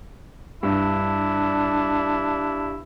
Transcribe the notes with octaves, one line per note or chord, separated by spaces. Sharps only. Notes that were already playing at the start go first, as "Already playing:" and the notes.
G2 D4 E4